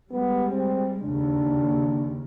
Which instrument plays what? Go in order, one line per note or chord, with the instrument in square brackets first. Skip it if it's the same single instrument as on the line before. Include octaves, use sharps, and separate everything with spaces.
[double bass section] G3 G#3 [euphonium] B3
[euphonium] C4
[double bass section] D#2 C#3 [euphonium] D4